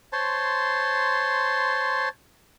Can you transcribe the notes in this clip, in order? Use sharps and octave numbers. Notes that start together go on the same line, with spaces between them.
C5 C#5 A5 C6